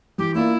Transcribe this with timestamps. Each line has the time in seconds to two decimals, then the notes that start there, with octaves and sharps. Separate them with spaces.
0.18 E3 G4
0.34 A#3 D4 E4 F4 A#4